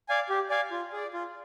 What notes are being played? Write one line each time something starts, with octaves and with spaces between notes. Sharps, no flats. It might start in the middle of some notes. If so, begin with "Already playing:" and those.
D5 F5 G#5
G4
D5 F5 G#5
F4
G#4 D5
F4